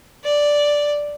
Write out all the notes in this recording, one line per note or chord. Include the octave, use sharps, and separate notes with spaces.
D5